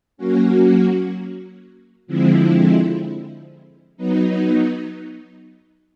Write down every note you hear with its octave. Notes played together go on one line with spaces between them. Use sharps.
F#3 A#3 C#4 F#4
D3 F3 G#3 C4 E4
F#3 B3 D#4